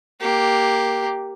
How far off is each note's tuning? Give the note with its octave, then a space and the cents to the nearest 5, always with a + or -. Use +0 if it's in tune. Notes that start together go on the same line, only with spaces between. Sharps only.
A#3 +0 G4 +0